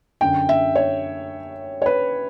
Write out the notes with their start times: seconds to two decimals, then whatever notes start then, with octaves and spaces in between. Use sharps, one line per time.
0.21 F#2 D3 G5
0.49 E5
0.75 C#5
1.82 C#5
1.86 B4